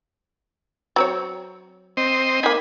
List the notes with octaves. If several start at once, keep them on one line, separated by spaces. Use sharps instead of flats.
F#3 C4 C#5
C4 C5 D#5
A#3 D#4 G#5 B5